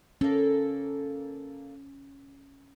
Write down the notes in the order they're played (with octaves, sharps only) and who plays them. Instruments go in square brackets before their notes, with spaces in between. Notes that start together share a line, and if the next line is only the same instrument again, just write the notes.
[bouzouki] A#3 A4 [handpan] C#4